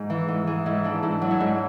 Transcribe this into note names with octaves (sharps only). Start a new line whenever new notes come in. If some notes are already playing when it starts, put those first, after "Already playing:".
Already playing: G#2
E3
G#2
E3 G#4
G#2 E4
E3 D4
G#2 E4
F#3
E4
G#2